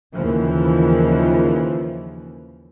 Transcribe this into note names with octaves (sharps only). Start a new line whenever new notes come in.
D#2 C#3 E3 F3